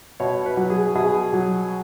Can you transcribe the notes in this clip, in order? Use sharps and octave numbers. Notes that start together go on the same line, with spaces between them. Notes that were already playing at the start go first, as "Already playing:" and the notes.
B2 C#5
B4
F#3
G#4
B2 G#4
F#3